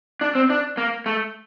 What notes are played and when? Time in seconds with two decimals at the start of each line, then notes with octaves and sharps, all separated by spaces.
0.21 D4
0.35 C4
0.50 D4
0.77 A#3
1.06 A3